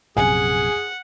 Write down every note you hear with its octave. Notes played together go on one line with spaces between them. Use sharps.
A#1 F#2 C3 G#4 F#5 G#5